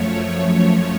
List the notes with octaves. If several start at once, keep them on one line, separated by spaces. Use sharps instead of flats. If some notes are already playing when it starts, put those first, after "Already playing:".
Already playing: F#2 F3 A3 C#5